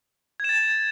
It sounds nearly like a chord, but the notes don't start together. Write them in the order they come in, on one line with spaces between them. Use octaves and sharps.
G#6 E7 A6